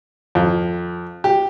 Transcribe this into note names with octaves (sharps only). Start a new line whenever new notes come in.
F2
G4